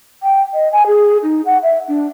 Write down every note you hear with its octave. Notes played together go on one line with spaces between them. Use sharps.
G5
D#5
G#5
G#4
D#4
F#5
E5
D4